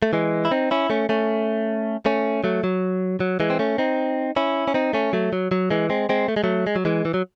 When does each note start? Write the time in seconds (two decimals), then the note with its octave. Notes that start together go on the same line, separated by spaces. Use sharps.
0.02 A3
0.13 E3 G#3
0.45 E4
0.51 C4 D#4
0.71 C#4 E4
0.90 A3 C#4
1.09 A3 C#4
2.06 A3 C#4
2.44 F#3 A3
2.64 F#3
3.20 F#3
3.40 E3 G#3
3.50 C4
3.59 A3 C#4
3.78 C4 D#4
4.36 C#4 E4
4.68 C#4
4.74 C4 D#4
4.93 A3 C#4
5.13 F#3 A3
5.33 F#3
5.51 F#3
5.70 E3 G#3
5.90 G#3 C4
6.09 G#3 C4
6.28 A3
6.36 G#3
6.44 F#3 A3
6.67 G#3
6.76 F#3
6.85 E3 G#3
7.05 E3
7.14 F#3